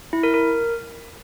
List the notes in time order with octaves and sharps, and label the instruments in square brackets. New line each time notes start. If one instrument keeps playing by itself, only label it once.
[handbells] E4
A#4
A#4